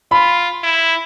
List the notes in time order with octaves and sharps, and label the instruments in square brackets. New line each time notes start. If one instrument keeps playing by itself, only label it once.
[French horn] F4 [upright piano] B5
[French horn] E4